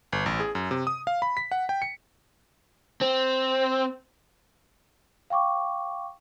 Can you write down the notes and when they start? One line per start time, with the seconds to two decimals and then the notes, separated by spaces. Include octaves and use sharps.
0.12 G1
0.26 A1
0.40 G#4
0.55 F#2
0.71 C3
0.87 D#6
1.07 F5
1.22 B5
1.37 B6
1.52 F#5
1.69 G5
1.82 C#7
3.02 C4
5.30 F5 G5 C#6 D6